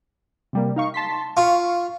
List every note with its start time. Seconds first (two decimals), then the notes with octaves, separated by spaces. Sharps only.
0.53 C3 G3 A#3
0.76 D#4 F5 C#6
0.94 A5 C6 B6
1.37 F4 F5 C#6